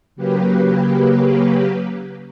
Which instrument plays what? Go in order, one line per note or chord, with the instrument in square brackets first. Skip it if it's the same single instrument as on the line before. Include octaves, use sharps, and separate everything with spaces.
[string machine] C#3 F#3 A#3 G4 B4